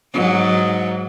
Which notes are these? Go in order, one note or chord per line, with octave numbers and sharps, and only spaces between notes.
G#2 F#3